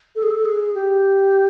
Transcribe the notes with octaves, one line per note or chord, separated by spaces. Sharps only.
A4
G#4
A4
G#4
G4